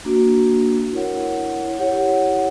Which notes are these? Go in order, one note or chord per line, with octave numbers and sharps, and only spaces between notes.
A#3 D4 F#4
E4 A#4 C#5 F#5
E4 G4 C#5 F#5